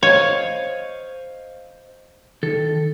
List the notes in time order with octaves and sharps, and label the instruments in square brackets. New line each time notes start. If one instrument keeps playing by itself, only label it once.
[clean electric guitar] C5 D#5 F5 [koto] C#5
[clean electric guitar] D#3 A4